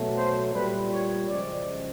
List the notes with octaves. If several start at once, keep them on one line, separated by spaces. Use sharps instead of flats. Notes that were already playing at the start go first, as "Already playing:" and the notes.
Already playing: B2 F#3 A3
C5
A#2 G3 B4
C#5
F#2 C#3 F3 G#3 D5